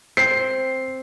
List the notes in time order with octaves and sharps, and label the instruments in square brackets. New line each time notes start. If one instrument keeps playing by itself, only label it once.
[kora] C4 [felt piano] C7